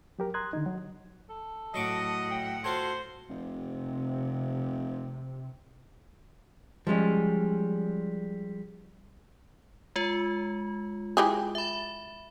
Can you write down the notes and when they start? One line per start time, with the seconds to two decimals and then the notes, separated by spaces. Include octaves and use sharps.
0.19 F#3 G4 A#4
0.34 A#5 C6 D#6 F#6 G#6
0.53 D3 D#3 D#4
0.66 F#3 F#4
1.30 A4
1.74 A2 F#3 D#5 F#5 C#6 D6
2.31 G5
2.64 F4 F#4 A4 C5 C#5
3.29 F1 C3
6.87 F3 G3 G#3 C#4
9.96 G#3 F4
11.17 E3 G4 G#4
11.55 E5 B5